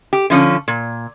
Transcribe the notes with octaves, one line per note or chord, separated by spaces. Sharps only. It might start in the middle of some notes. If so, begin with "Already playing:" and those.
G4
D3 F3 C#4
A#2